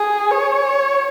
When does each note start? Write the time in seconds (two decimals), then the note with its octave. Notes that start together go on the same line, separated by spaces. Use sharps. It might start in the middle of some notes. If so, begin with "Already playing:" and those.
Already playing: G#4
0.30 C#5